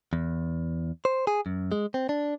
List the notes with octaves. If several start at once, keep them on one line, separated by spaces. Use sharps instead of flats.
E2
C5
G#4
F#2
G#3
C4
D4